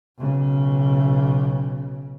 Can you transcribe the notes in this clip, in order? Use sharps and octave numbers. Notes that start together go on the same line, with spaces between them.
B1 C#3